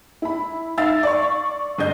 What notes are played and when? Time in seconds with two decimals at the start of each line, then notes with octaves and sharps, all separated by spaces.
0.22 E4 B5
0.78 D#4 E5 F5 E6 A6
1.03 D5 C#6
1.78 G1 D#5 G6